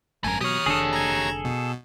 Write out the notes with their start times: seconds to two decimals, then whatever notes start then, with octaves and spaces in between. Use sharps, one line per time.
0.24 G#1 F#2 A3 A#4 G#5
0.41 B2 F#3 G4 C#5 D#6 F6
0.66 F1 D3 D4 G#4 A4
0.93 A#5 G#6
1.45 B2